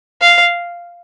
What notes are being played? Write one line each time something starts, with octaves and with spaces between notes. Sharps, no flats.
F5